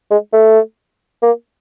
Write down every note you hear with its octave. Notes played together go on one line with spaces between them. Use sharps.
G#3
A3
A#3